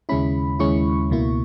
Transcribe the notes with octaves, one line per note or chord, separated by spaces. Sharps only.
D#2 C#3 G#3 C#4 E4 B5
D#2 C#3 G#3 C#4 E4 C#6
C#2 B2 A#3 E4